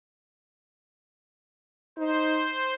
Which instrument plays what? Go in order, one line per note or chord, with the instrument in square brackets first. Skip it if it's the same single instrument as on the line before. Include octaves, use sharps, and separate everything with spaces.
[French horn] D#4 [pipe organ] C5